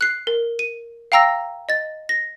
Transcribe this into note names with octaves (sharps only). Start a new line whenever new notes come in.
F#6 C7
A#4
D#7
F5 G5 A#5 E6 A#6
D#5 A6
A#6